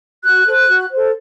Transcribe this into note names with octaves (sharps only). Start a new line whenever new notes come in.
F#4 F#6
A4 C5
F#4
A4 C5